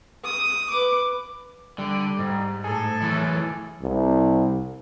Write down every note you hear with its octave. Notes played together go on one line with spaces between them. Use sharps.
D#6
B4 D6
D3 G3
G#2
A2 G#4 A4
E3 F#3
C2